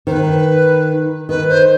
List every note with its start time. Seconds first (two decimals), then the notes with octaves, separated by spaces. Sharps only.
0.07 D#3 C5
0.11 B4
1.29 D#3 B4
1.48 C5